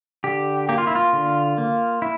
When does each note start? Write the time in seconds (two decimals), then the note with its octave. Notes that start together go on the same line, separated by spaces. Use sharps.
0.24 D3 G4
0.69 A#3 G4
0.78 F4
0.87 E4
0.95 F4
1.13 D3
1.58 A#3
2.02 E4